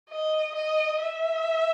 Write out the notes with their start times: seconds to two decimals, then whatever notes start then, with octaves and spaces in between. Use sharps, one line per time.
0.09 D#5
0.55 D#5
1.00 E5